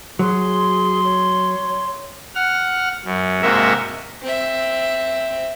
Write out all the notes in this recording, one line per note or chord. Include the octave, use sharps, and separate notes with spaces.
F#3 G#4 C6
C#5
F#5 F6
F#2
G#2 C3 A#3 F#4 A#4 E5
C4 E5